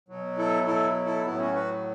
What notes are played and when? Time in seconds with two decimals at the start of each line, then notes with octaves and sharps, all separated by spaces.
0.09 B2 F#3
0.37 E4 A4
0.66 E4 A4
1.05 E4 A4
1.25 A2 F#3 B3 E4
1.39 C#4 F#4
1.54 F#4 B4